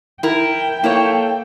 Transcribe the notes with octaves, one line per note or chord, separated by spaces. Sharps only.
E4 A#4 G5
A#3 E4 A4 C#5